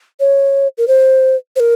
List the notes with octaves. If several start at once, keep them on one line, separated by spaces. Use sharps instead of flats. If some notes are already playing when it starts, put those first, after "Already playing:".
C#5
A#4
C5
C5
A#4